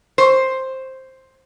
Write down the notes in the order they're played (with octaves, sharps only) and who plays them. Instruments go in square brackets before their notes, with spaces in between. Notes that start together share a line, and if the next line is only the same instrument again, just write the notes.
[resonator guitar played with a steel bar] C5